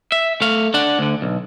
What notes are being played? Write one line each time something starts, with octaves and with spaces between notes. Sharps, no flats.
E5
A3 F5
D4 F#5
D2 D3
B1